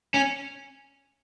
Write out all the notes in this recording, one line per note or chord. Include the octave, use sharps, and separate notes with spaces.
C#4